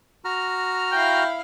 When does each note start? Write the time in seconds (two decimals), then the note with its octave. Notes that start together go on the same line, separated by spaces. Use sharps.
0.25 F#4 A#5 F6
0.92 E4 F5 G5